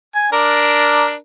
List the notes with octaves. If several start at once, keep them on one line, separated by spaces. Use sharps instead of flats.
G#5
D4 A#4